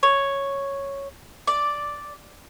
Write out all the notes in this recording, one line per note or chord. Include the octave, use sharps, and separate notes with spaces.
C#5
D5